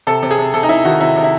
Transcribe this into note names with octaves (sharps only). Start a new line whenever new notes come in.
C3 A4
C3
G#4
C3
C3 A4
D#4
C3 E4
D#3 F#4
C3 E4
C3
E4